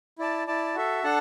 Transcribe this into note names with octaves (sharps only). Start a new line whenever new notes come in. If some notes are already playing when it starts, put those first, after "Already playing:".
E4 D5 A5
E4 D5 A5
F#4 A4 E5
D4 A4 F#5 A5